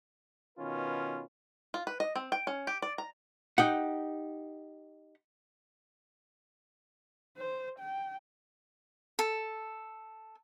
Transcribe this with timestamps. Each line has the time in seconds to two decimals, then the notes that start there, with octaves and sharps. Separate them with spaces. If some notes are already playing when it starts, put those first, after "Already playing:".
0.58 B2 D#3 C#4 F4 B4
1.74 F4
1.87 B4
2.00 D#5
2.16 C4
2.32 G5
2.47 C#4
2.67 G4
2.82 D5
2.98 A#5
3.58 D#4 G4 F#5
7.38 C5
7.80 G5
9.19 A4